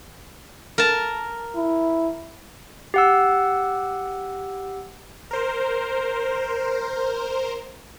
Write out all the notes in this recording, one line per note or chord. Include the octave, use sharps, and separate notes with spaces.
A#4 A5
E4
G4 F#5 E6
A#4 C5